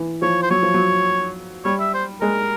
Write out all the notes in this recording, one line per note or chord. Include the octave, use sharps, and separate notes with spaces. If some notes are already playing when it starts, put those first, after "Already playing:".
Already playing: E3
F3 C#5
C5
F#3 C#5
F3
F#3
G3 C#5
E5
C5
G#3 A#4